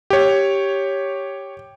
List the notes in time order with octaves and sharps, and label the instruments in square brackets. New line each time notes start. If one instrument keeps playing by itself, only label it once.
[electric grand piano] G4 C#5